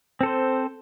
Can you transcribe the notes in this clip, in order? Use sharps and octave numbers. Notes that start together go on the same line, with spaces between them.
C4 A4 C5